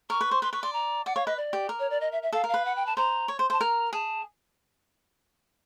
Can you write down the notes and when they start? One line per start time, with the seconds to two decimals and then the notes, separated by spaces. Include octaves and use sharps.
0.10 A#4 C#6
0.21 B4
0.31 C5
0.42 B4 C6
0.53 B4 C#6
0.63 D5 C6
0.73 A#5
1.06 D5 F#5
1.16 C#5 F5
1.26 B4 D#5
1.37 D5
1.53 G4
1.69 A#4
1.80 C#5
1.90 D5
2.01 D#5
2.12 E5
2.23 E5
2.33 A4 F5
2.44 A#4
2.49 F5
2.54 B4
2.65 F#5
2.76 G5
2.86 A5
2.96 C5 A#5
3.28 C#5
3.39 C5
3.50 C5 A5
3.60 A#4 A#5
3.93 G#4 A5